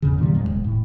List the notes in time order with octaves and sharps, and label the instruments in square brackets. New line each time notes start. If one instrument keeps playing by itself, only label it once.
[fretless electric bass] E2 C#3
A#2 D#3 E3 G3
F2 G#3
E1
A2